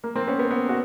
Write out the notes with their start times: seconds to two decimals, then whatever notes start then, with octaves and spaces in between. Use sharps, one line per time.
0.04 A#3
0.15 A#3 C4
0.27 B3 C#4
0.39 B3
0.51 B3
0.69 F#4